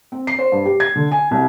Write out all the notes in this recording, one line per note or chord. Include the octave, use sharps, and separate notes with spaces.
C4
C7
C5
G2
G4
G#6
D3
G#5
C2